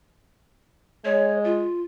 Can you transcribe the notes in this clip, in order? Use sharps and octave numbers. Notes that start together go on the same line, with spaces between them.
G#3 C#5
F4